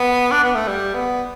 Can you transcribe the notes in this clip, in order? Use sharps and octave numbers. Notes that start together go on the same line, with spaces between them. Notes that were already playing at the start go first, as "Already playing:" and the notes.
Already playing: B3
D4
B3
A3
G3
B3